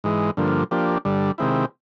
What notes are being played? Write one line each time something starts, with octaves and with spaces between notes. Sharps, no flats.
G#2 E3 G#3
G2 D3 F3 A#3
F3 A#3 D4 G4
G2 D3 G3
C3 D#3 G#3 C4 E4